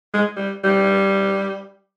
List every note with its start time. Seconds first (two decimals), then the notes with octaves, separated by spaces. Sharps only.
0.14 G#3
0.36 G3
0.64 G3